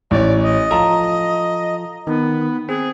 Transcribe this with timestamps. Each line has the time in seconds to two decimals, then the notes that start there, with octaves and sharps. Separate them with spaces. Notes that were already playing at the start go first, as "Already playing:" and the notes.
0.11 A1 C#5 D5
0.43 D#5
0.71 F3 F4 A4 A#5
2.07 D#3 B3
2.69 C4 G#4